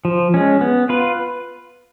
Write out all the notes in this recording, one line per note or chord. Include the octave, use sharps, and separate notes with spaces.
F3
G#3 C#4
B3
F4 B4